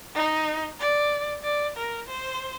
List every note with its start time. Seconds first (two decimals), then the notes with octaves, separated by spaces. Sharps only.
0.15 D#4
0.80 D5
1.44 D5
1.76 A#4
2.08 C5